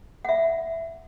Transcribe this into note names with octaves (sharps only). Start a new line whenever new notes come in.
E5 F#5